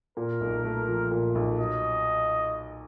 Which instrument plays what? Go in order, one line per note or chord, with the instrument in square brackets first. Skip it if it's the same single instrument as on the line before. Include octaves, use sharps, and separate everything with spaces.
[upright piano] A#2 [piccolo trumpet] A#4
[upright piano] B1
A3
F3
A#2
B1
[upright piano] F#3 [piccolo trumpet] D#5